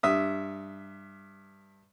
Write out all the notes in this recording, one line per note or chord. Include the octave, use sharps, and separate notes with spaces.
G2 E5 D#6